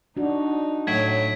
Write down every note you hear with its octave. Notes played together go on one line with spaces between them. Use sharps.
D4 D#4 F#4
A2 F#3 G#6 B6 D7